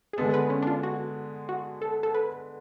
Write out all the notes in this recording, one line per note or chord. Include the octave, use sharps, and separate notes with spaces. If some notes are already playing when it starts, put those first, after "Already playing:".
G#4
D3 G#3 B3 A4
B4
C#4
D4
F4
F#4
F#4
A4
A4
B4